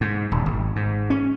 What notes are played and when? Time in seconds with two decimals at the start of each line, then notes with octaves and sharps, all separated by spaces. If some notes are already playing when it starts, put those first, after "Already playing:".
0.01 G#2
0.31 D#1
0.46 G#1
0.76 G#2
1.10 C#4